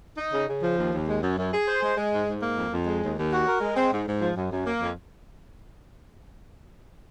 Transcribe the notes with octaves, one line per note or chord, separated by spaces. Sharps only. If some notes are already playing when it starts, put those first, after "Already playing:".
D#4
C#3
C#3
F3
D#2
D#2
G#3
F#2
F#2
G#4
C5
G#3
G#3
G#2
G#2
A#3
F2
F2
G#3
D#2
D#2
F#4
A#4
G#3
C4
G#2
G#2
F3
F#2
F#2
A#3
F2